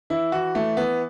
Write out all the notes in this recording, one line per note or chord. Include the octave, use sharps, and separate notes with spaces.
E3 E4
E3 F#4
E3 A3
E3 B3